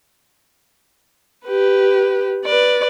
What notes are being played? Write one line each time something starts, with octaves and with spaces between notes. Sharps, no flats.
G4 B4
B4 D5